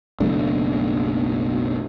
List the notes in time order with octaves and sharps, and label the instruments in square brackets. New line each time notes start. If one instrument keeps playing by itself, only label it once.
[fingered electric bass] F#1 B1 A3 D4